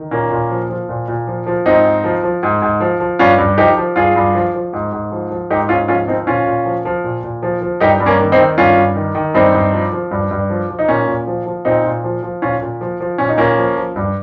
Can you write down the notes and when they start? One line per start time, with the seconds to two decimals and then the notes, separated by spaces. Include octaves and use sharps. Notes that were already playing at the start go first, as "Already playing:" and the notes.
Already playing: D#3
0.11 A#2 A#3 C#4
0.31 A#2
0.51 F3
0.70 F3
0.89 A#2
1.08 A#2
1.27 F3
1.46 F3
1.66 G#2 C4 D#4
1.85 G#2
2.04 F3
2.23 F3
2.43 G#2
2.62 G#2
2.80 F3
3.00 F3
3.19 G2 C#4 F4
3.38 G2
3.58 F3 D#4 G4
3.77 F3
3.96 G2 F4 G#4
4.16 G2
4.35 F3
4.55 F3
4.73 G#2
4.92 G#2
5.12 F3
5.31 F3
5.50 G#2 D#4 G4
5.69 G#2 C#4 F4
5.88 F3 C#4 F4
6.08 F3 C4 D#4
6.27 A#2 C#4 F4
6.46 A#2
6.66 F3
6.85 F3
7.04 A#2
7.23 A#2
7.43 F3
7.61 F3
7.80 G2 D#4 G4
8.00 G2
8.06 A#3 C#4
8.19 D#3
8.32 C4 D#4
8.38 D#3
8.58 G2 C#4 F4
8.77 G2
8.96 D#3
9.15 D#3
9.34 G2 C4 D#4
9.54 G2
9.72 F3
9.92 F3
10.11 G2
10.31 G2
10.50 F3
10.69 F3
10.79 D#4
10.88 A#2 A#3 C#4
11.07 A#2
11.27 F3
11.46 F3
11.65 A#2 C4 D#4
11.85 A#2
12.04 F3
12.22 F3
12.42 A#2 C#4 F4
12.61 A#2
12.81 F3
13.00 F3
13.18 A#2 C#4
13.29 D#4
13.38 A#2 A#3 C#4
13.57 F3
13.76 F3
13.96 G2